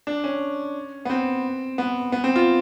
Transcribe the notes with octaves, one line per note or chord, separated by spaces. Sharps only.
D4
C#4
B3
C4
B3
B3
C4
F4